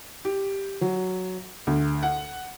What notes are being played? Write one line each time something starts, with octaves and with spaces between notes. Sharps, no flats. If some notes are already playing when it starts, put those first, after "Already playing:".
G4
F#3
D2
F#5